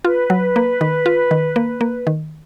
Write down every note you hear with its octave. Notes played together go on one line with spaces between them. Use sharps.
F4 B4
F#3
A#3
D#3
F4
D#3
A#3
A#3
D#3